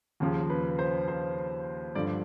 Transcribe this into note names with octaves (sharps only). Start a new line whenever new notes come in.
D#2 C#3 F3
B4
C5
C5
G2 D3 F3 D5